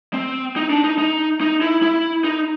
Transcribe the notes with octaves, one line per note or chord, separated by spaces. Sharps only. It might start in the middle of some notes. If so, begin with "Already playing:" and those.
C4
D#4
D4
D#4
D#4
D#4
E4
E4
D#4